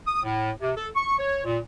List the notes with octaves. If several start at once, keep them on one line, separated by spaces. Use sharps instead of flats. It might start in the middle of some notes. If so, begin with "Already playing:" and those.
D#6
A2
C3
A4
C#6
C#5
A#2